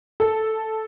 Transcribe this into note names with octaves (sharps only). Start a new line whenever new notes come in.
A4